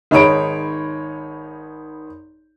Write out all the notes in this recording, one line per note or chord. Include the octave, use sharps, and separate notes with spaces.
G#1 D#4 G#4 C#5 B5 D7